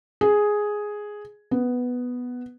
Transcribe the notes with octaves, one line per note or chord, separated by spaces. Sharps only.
G#4
B3